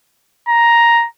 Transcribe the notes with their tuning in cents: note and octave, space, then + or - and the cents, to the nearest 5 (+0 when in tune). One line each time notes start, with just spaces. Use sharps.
A#5 +5